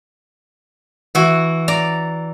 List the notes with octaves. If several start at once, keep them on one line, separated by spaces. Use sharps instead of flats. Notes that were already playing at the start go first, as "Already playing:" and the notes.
E3 F#4
D5 A#5